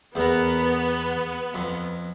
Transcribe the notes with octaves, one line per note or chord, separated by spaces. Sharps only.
E2 B3 A#4
F2